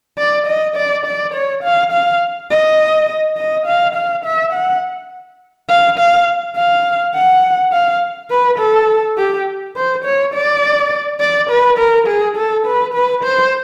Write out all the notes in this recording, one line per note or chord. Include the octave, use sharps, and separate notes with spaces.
D5
D#5
D5
D5
C#5
F5
F5
D#5
D#5
F5
F5
E5
F#5
F5
F5
F5
F#5
F5
B4
A4
G4
C5
C#5
D5
D5
B4
A#4
G#4
A4
B4
B4
C5